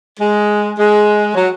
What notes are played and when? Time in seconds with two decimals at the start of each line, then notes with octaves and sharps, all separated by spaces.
0.20 G#3
0.78 G#3
1.35 F#3